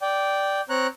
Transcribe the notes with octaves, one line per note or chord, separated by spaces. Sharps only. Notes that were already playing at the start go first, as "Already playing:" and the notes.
D5 G5
C4 C#5 A#5 F#6